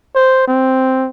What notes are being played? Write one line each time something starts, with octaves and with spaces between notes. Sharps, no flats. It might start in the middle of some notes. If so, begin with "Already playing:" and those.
C5
C4